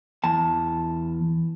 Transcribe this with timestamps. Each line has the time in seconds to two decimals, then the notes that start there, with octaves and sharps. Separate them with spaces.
0.24 E2 A5